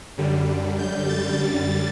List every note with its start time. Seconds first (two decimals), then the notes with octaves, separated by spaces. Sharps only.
0.18 F#2 D3 G3
0.79 G6
1.09 A6
1.39 F#2 D3 G3